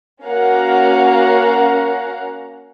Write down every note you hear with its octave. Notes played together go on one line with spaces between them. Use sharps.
A#3 C#4 F#4 F5 F#5 A#5